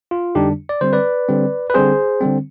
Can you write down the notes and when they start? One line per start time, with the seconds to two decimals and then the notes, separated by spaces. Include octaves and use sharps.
0.11 F4
0.35 F2 D3 G3 D4 D#4 G4
0.69 D5
0.81 D3 G3 C4 C5
0.93 B4 D5
1.29 D3 G3 C4
1.70 B4
1.74 D3 G3 C4 G#4 C5
2.21 D3 G3 C4